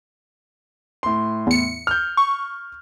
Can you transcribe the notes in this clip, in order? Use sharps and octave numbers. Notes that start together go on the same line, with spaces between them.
A2 C6
E2 C#7
F6 G6
C#6